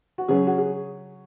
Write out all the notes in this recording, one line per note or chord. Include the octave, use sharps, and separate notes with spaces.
F#4
C#3 F#3 C#4 G#4
F#4
G#4